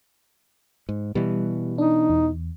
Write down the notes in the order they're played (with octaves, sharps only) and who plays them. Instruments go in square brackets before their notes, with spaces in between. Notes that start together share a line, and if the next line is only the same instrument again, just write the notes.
[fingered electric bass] G#2
[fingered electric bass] B2 E3 [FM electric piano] G3
[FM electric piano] D4 [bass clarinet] D#4
[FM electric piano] E2